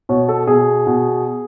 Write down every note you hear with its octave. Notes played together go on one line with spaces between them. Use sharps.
B2 C#5
A4
B2 G#4
B2